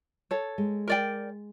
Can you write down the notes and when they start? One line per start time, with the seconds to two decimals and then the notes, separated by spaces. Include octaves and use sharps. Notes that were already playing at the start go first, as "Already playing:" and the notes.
0.31 A4 C#5
0.58 G#3
0.88 A#4 D5 G5